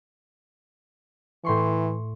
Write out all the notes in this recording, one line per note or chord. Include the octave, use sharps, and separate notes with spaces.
A2 E3 C6 C#6